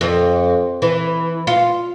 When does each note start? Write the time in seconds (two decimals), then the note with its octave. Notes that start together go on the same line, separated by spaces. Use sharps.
0.01 F2
0.82 E3
1.47 F4